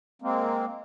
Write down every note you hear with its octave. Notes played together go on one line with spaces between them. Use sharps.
G#3 A#3 C4